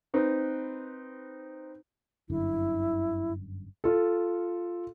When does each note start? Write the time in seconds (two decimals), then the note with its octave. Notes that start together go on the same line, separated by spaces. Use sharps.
0.14 C4 D#4 B4
2.30 G1 F#2 D3 E4
3.84 F4 A4